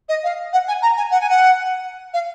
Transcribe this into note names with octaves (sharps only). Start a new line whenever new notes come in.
D#5
F5
F#5
G#5
A#5
G#5
F#5
G#5
F#5
F5